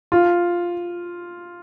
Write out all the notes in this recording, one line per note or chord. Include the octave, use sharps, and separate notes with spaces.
F4